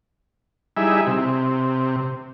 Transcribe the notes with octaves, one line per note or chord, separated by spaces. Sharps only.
G3 D#4 E4 G#4 E5
C3